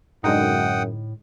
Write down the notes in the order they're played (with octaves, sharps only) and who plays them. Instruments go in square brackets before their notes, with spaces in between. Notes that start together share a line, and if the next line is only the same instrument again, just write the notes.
[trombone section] F#2 [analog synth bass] A2 [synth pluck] D3 G#3 D#4 [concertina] F#5 G5 D#6